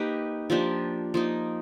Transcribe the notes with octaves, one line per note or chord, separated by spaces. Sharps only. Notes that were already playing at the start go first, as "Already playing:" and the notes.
Already playing: A#3 D#4 G4 B4
F3 A#3 D4 G4
F3 A#3 D#4